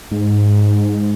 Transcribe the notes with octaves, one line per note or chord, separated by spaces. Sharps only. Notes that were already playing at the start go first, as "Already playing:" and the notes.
G#2